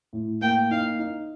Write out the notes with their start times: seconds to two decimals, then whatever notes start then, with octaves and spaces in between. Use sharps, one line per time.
0.13 A2
0.41 A#3 G5
0.71 D#4 F5
0.99 D#4